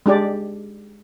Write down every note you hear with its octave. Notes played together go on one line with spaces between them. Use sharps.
G#3 D4 G4 D5